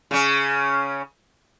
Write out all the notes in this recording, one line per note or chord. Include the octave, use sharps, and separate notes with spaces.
C#3 C#4